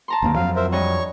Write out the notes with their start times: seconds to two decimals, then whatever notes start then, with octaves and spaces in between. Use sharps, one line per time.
0.08 A5 A#5 C6
0.22 G1 D#2 A#3
0.35 F2 F3 F#3 F5
0.56 A#4 C5 E5
0.72 G2 C#5 D#5 C#6